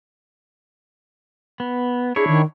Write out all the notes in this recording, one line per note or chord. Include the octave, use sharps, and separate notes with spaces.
B3
D4 E4 G#4 C#5
D#3